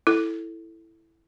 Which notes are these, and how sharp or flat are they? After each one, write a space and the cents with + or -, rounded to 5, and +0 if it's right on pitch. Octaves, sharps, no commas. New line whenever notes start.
E4 +0 A4 +0